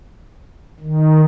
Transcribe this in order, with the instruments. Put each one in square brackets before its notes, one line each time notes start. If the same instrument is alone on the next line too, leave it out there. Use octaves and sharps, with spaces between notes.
[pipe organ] D#3